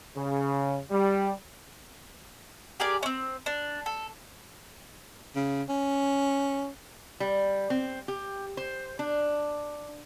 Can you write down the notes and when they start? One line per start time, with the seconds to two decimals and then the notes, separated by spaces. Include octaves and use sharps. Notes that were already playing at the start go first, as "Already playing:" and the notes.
0.16 C#3
0.91 G3
2.80 G4 G#4 A#4 D5
3.03 C4 C#4
3.46 D4
3.86 A4
5.36 C#3
5.69 C#4
7.20 G3
7.70 C4
8.08 G4
8.57 C5
8.99 D4